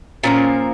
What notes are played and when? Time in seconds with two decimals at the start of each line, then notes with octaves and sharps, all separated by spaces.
0.24 A#2 F3 A#3 C#4